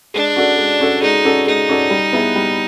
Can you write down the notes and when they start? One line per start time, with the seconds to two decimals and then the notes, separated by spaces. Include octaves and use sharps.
0.14 G#3 D4
0.36 C#4 F#4 A4 D5
0.58 G#3
0.80 C#4 F#4 A4 D5
1.02 G#3 D#4
1.25 C#4 F#4 A4 D5
1.47 G#3 D#4
1.69 C#4 F#4 A4 D5
1.90 G3
2.13 B3 E4 G#4 B4
2.36 G3